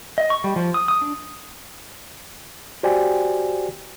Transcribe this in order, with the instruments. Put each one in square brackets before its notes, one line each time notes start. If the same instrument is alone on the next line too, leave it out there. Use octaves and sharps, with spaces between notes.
[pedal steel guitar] D#5
C#6
G3
F3
D#6
D#6
D4
[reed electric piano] F#4 G4 C5 D5 G5 G#5